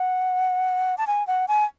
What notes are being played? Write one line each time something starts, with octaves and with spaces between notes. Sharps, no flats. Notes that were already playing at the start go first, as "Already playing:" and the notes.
Already playing: F#5
A5
G#5
F#5
G#5